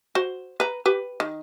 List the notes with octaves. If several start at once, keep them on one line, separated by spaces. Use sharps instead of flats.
F#4 C5
B4 A#5
G4 B4
D#3